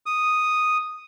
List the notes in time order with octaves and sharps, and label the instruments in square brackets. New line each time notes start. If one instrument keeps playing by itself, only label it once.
[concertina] D#6